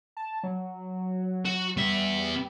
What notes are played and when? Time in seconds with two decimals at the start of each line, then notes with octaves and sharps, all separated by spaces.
0.17 A5
0.43 F#3
1.45 F#4
1.77 G3 B3 E5